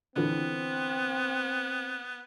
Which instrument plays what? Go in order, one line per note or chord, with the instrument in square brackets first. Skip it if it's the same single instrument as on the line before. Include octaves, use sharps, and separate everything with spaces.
[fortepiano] D3 E3 [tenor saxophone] B3 [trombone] C4